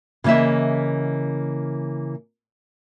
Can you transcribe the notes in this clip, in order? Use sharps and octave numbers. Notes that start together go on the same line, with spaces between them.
C#3 E3 A#3 D#5 E5